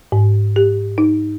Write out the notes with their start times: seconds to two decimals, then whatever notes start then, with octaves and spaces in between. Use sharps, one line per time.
0.12 G#2
0.56 G4
0.98 D#4